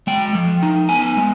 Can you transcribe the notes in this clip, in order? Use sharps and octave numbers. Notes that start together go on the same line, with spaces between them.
G#3 G5
F3
D#4
B3 G#5
G#3